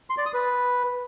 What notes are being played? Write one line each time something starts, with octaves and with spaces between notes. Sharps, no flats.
C6
D5
D#6
B4